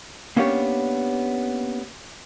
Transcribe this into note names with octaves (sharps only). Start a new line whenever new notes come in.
A#3 B3 C#4 D4 G4 C#5